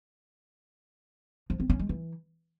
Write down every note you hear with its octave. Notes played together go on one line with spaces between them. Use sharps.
F3
C4
C#4
G#3
E3